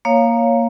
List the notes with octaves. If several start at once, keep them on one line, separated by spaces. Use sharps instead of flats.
A#3 C#5 F5